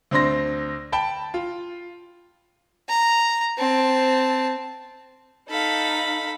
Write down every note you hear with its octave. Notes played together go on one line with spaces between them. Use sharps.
D2 C4 D4 C6 A#6
G5 A5 B5
F4
A#5
C4 A5
D#4 A4 F5 B5